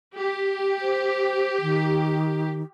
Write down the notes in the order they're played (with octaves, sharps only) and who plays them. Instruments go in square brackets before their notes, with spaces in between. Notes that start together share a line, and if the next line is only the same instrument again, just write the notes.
[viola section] G4
[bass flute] C5
D#3